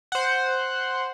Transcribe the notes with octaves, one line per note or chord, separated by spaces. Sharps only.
C5 F#5